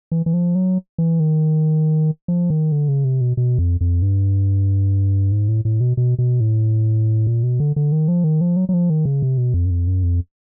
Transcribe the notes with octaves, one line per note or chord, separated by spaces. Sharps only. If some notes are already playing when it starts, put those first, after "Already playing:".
E3
E3
F3
F#3
E3
D#3
F3
D#3
D3
C#3
C3
B2
B2
F2
F2
G2
G#2
A2
A2
B2
B2
B2
A2
A#2
B2
D3
D3
D#3
F3
D#3
F3
F#3
F#3
F3
D#3
C#3
C3
B2
F2
F#2
F2
F#2
F2